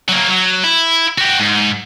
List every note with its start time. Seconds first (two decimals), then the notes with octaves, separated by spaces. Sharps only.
0.09 F#3 A#3
0.29 F#3
0.64 E4
1.18 F#4 G4
1.40 G#2